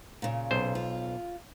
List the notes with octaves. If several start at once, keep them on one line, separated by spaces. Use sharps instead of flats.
A#2 C#3
B1 C5
F4